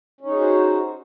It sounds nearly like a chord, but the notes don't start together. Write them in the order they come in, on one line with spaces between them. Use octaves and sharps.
C#4 D#4 G#4 F#4 C5